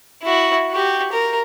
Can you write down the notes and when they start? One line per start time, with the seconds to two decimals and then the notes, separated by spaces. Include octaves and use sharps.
0.23 E4 F#4
0.71 F#4 G4
1.12 A#4